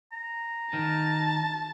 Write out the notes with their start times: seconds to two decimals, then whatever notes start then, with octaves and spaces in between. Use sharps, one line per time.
0.12 A#5
0.73 D#3 A5